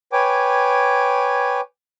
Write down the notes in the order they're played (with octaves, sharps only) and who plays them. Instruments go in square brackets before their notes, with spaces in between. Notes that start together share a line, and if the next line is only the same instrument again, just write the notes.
[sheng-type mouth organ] B4 C#5 G5 G#5 D6